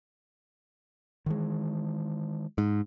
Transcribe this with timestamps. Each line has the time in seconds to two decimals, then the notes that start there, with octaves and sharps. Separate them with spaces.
1.26 D#3 E3 G#3
2.58 G#2